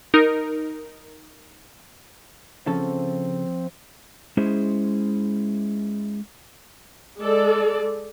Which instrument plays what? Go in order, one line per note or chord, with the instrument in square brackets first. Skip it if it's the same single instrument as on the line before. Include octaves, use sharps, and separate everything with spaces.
[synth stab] D#4 A#4
[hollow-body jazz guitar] C#3 A4 [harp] F3 [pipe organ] C4
[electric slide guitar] G#3 C#4 E4 G#4 C5
[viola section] G#3 A4 D5